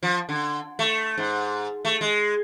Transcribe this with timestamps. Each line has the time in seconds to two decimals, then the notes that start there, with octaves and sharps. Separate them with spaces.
0.03 F3
0.29 D3
0.79 A3
1.18 G#2
1.85 A3
2.01 G#3